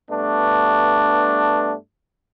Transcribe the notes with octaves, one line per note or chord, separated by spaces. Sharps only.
G2 A3 B3 D4